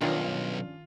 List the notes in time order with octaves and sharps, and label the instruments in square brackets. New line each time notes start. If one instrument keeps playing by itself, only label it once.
[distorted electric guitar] B1 [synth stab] G2 C#4 D4 [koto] D#3 [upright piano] F4